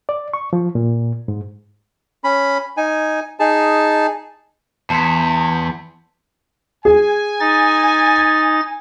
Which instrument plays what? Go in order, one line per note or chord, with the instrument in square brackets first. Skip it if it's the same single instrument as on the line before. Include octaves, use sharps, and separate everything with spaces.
[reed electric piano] D5
C#6
F3
A#2
G#2
[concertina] C#4 B5
D#4 G#5
D#4 G#4 A5
[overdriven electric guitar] E2 [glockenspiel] A5 C6 B6
[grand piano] G#4 [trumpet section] G#5
[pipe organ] D#4 A6